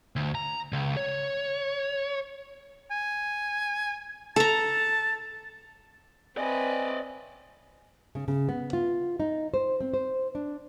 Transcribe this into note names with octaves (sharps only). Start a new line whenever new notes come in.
D2
A#5
C#2
C#5
G#5
A4 A5 A#5
C4 B4 D5 D#5 G#5
C#3
C#3
B3
F4
D#4
C5
C4
C5
D4